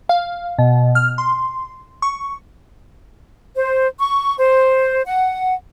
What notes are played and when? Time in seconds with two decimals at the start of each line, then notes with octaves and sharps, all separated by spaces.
0.09 F5
0.59 B2
0.95 F6
1.18 C6
2.02 C#6
3.56 C5
3.99 C#6
4.39 C5
5.06 F#5